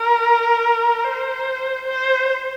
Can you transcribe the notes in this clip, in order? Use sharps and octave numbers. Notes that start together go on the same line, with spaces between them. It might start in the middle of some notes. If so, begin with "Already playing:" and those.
Already playing: A#4
C5
C5